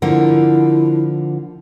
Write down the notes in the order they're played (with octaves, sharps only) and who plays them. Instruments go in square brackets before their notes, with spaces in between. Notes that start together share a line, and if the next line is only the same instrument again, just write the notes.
[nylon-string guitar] D3 F3 A#3 [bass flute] E4